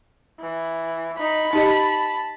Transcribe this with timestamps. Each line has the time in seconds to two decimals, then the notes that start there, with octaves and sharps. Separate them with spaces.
0.41 E3
1.20 D#4 B5
1.53 D#4 G4 D#5 A5